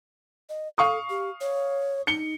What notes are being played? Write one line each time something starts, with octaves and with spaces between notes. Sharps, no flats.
D#5
A4 F5 C#6 D#6
G4
C#5
D#4 C#7 G7